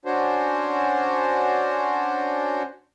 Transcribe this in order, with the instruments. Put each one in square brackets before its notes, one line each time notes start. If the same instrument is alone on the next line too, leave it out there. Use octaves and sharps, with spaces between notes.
[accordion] C#4 D4 F#4 C5